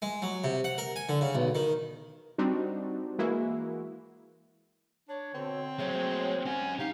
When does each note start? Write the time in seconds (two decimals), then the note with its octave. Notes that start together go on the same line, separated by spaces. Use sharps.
0.02 G#3
0.22 F#3
0.44 C3
0.64 F#5
0.78 A#4
0.96 G#5
1.09 D3
1.21 C#3
1.35 B1
1.55 D#3
2.38 G3 C4 D4 D#4 F#4
3.19 E3 G#3 A#3 E4 F#4
5.09 D4 C#5
5.34 B2 D3 C4
5.79 F#3 G#3 A3 C#5
6.45 G2 G#3 C#4 F#5 G#5
6.79 D#4 G4 F5